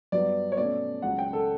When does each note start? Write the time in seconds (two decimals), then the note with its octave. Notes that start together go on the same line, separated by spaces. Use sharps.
0.12 G2 F#3 B3 D5
0.52 C#5
0.57 B2 A3 C#4 D5
1.02 C#2 C#3 F#3 C#4 F#5
1.19 G5
1.33 A4